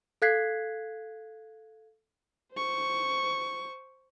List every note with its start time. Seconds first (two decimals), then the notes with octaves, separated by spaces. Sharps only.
0.22 A4 F5 F#6 G#6 B6 C7
2.54 C5 C#6